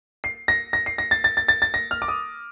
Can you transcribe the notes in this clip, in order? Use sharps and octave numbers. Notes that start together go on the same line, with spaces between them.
C7
A#6
A#6
C7
A#6
A6
A6
A6
A6
A6
A#6
F6
D6
D#6